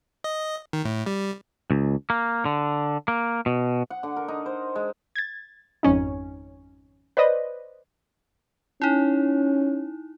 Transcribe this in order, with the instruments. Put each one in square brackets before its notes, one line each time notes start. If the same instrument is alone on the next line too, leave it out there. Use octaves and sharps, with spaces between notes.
[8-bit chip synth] D#5
D#3
A2
G3
[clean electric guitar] C#2
A#3
D3
A#3
B2
[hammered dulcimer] F#5
D3
A#4
D#4
C5
G#3
[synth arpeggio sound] G#6 A6
G#1 F2 C#4 D#4
B4 C5 D5 D#5
[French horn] C#4 [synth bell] D#4 E4